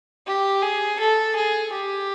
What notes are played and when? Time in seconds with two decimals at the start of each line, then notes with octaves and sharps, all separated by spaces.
0.27 G4
0.62 G#4
0.99 A4
1.36 G#4
1.72 G4